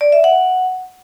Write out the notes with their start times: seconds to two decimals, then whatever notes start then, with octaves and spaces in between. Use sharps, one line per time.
0.01 D5
0.12 E5
0.24 F#5